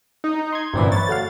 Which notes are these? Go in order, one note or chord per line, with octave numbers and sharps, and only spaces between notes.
D#4
C6 G#6
G1 F#2 A#2 E3 C4 D5
B4 C#5 A6
A3 F#4 F5